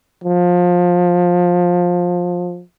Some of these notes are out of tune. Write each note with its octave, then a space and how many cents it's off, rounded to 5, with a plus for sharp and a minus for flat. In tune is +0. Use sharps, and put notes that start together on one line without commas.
F3 +20